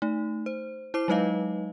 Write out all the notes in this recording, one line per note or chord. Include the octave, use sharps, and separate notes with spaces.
A3 D#4
C5
E4 C5 D6 C7
F#3 G#3 D#4 B4 D#5 F5